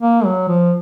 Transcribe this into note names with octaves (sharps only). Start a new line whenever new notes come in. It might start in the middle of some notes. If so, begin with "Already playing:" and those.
A#3
F#3
F3